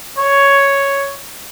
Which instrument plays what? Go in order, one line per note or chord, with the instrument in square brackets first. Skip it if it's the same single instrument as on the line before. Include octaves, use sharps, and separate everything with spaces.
[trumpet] C#5